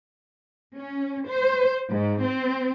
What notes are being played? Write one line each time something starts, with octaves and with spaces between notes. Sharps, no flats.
C#4
C5
G#2
C4